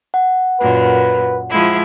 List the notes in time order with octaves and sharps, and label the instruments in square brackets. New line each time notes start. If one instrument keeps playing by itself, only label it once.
[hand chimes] F#5
[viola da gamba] F#2 A#2 [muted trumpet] B4
[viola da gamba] F3 G#3 E4